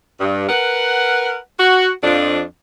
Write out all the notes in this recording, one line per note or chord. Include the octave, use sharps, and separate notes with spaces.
G2
A#4 B4 F#5
F#4
F2 F3 D4